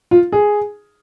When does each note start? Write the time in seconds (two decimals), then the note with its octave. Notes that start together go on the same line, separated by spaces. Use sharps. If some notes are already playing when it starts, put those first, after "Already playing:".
0.11 F4
0.32 G#4